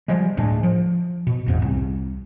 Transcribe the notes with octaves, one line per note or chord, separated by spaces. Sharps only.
F3 G3 G#3
D2 A2 G#3 D4
F3
B2
A1 E2 G#2
C2